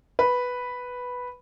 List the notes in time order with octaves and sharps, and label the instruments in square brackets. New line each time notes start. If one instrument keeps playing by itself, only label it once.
[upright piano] B4